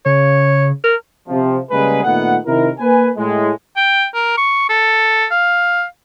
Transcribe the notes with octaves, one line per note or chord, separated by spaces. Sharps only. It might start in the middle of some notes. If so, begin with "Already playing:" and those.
C#3 C#5
A#4
C3 F3
C#3 G3 G#3 A#3 G#4 B4
A#2 D#3 A3 B3 F#5
C3 D#3 E4 A#4
A#3 B4 G#5
A2 G#3
G5
A#4
C#6
A4
F5